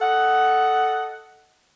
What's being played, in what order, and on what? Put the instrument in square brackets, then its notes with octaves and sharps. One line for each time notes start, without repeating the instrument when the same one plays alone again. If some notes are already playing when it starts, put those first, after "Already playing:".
[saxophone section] A4 D#5 F#5